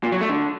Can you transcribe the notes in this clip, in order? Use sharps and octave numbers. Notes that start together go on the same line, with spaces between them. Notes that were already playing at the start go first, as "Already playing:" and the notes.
A#2
F#3
A3
D3